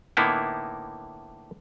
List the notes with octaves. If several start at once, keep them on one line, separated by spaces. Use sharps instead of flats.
A2 D3 A#3 B3 D#4 E4